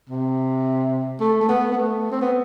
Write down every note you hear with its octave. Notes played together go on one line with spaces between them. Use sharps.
C3
A3
A3
B3
B3
A3
C4
B3